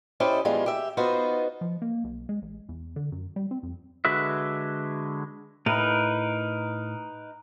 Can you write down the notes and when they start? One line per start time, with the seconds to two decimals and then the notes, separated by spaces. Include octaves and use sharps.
0.20 C#4 E4 G4 A4 C5 D#5
0.45 E2 A2 G3 G#3 F4
0.66 G4 E5
0.97 B3 D#4 F4 F#4 C5
1.61 F3
1.82 A#3
2.04 B1
2.29 G#3
2.42 A1
2.69 E2
2.96 D3
3.12 F#2
3.36 G3
3.51 C4
3.63 F2
4.05 D3 G#3 F#4 B4 E5
5.66 A2 D#4 A#4 B4